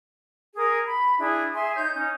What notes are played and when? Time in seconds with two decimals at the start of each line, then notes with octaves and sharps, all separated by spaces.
0.56 G#4 A#4 D#6
0.86 B5
1.19 D4 E4 G#4
1.54 G#4 E5 G#5 C6
1.76 D#4 C#5 G6
1.94 C#4 D#4